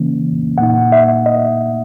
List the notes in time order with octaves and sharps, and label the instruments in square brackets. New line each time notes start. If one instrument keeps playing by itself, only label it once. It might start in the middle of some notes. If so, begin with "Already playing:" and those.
Already playing: [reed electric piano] C#3 E3 A#3 C#4
A#2 A#3 D#4 F#5
E5
D#5